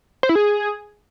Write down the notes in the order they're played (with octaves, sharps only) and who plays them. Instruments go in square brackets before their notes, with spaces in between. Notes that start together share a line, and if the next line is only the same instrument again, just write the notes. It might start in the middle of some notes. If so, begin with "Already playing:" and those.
[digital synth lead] C5
E4
G#4